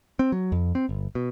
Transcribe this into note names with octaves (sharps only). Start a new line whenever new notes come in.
C4
F#3
F2
C4
G1
B2